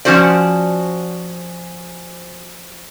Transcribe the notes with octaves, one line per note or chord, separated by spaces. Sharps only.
F3 C#4 F#4 C5 D5